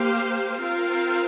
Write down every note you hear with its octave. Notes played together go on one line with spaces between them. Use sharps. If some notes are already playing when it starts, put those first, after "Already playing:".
Already playing: A#3 G4 C5 F5
C4 F4 A#4 F5